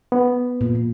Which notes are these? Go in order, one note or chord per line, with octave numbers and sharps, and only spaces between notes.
B3
A#2